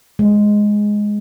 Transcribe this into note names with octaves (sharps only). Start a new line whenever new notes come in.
G#3